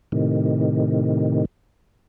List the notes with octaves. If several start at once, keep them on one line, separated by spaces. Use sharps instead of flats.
A2 C3 D#3